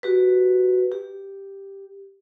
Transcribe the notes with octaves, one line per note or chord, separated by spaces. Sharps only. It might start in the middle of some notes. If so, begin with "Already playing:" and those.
F#4 G4 B4
G4